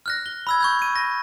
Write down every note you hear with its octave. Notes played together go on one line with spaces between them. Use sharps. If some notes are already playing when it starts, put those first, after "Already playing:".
F6 F#6 A#6
G7
B5 E6 G#6
C#6 G6 G#6
C#6 D#7
A#6